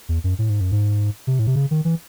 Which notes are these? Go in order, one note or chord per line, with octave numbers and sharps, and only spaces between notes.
E2
F#2
A2
G#2
F#2
G#2
C3
A2
C3
C#3
D#3
E3